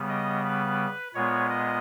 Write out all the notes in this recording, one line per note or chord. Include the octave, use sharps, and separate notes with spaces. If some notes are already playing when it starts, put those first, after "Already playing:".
Already playing: C#3 G3 B3
D#5
B4
A#2 G#3 B3 C#5
D#5